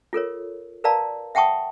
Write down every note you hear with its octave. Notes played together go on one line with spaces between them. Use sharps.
F4 A4 A#4 C#5
A#4 B4 D5 F5 A5 A#5
E5 F#5 G5 A5 C#6 D#6